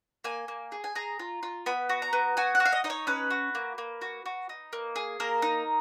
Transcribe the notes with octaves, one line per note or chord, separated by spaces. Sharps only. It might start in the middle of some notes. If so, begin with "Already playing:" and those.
A#3 G#5
A#3
G#4
G#5
G#4 A#5
F4
F4
B3 B5
F#4
A#5
B3
F#4 G#5
F#5
F#4
F5
D#5
D#4 D#5
C#5
C#4 B4
F#4
A#3
A#3
F#4
F#4
D#4
A#3
G#4
A#3 A#4
D#4